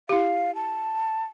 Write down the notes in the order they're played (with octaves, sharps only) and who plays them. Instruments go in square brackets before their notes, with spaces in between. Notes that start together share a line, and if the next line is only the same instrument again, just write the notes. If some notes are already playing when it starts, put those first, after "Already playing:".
[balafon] E4 G4 [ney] F5
[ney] A5